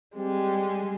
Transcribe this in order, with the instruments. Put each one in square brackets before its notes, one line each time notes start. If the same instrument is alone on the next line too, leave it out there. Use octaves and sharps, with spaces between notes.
[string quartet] G3 G#3 [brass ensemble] C4 G4